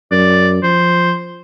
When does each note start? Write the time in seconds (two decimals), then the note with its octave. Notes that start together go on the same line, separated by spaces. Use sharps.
0.11 F#2 D5
0.63 F3 C5